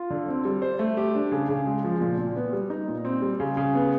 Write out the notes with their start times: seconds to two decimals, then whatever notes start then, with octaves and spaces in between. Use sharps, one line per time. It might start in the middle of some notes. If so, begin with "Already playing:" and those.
Already playing: F4
0.10 D3
0.28 C4
0.45 G3
0.62 C5
0.79 A3
0.97 G4
1.15 D4
1.32 C#3
1.49 C#3
1.67 G#3
1.84 F3
2.01 A#2
2.18 A#2
2.36 B3
2.53 G3
2.70 D#4
2.88 A#2
3.05 C4
3.22 G3
3.40 C#3
3.57 C#3
3.75 B3